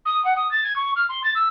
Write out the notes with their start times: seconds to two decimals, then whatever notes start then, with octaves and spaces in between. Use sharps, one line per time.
0.05 D#6
0.24 F#5
0.36 D#6
0.51 A6
0.63 G#6
0.76 C#6
0.96 F6
1.09 C6
1.23 A6
1.35 E6